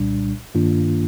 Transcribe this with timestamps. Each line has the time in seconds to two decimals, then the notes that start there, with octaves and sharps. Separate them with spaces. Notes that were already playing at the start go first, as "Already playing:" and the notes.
Already playing: C2 A#2 G3 D4
0.55 G2 D#3 A#3 D4 F4